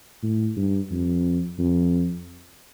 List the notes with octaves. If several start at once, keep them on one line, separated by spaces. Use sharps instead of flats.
A2
G2
F2
F2